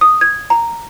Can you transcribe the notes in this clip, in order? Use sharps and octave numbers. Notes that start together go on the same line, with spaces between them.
D#6
G#6
A#5